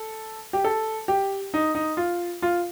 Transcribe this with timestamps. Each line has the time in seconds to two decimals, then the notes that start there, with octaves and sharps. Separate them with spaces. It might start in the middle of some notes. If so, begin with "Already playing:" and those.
Already playing: A4
0.53 G4
0.64 A4
1.08 G4
1.54 D#4
1.75 D#4
1.97 F4
2.42 F4